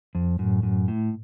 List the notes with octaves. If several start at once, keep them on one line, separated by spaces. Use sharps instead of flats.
F2
F#2 A2
F#2
A2